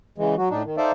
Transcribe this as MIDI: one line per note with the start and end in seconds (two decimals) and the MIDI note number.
0.18 0.35 49
0.18 0.35 52
0.18 0.35 56
0.38 0.49 54
0.38 0.49 66
0.50 0.63 45
0.50 0.63 62
0.50 0.63 63
0.65 0.76 51
0.77 0.92 63
0.77 0.92 69
0.77 0.92 72
0.77 0.92 74
0.77 0.92 76
0.77 0.92 77